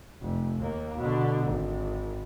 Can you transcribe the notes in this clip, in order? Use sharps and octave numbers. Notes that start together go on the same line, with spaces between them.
F1
D#2 A#3
B2 D3
G#1